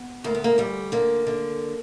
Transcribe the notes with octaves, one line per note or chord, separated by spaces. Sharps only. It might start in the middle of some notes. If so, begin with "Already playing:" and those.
Already playing: B3
D2 A#3
B3
A#3
D2 G3
D3 A#3
D3